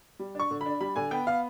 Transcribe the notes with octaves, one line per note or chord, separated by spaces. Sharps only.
G3
D4 C#6
D3
D4 B5
G3 B5
D3 G#5
B3 G5
B3 F5